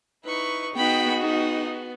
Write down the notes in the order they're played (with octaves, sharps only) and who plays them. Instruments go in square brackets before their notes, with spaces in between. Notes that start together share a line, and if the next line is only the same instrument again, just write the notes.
[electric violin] D#4 E4 [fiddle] B4 C#6
[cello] B3 D#4 [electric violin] F#4 G#4 [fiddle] G5 B5
[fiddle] B3 [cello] D#4